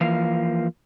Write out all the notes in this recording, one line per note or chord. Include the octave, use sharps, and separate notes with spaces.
E3 F3 A#3 F5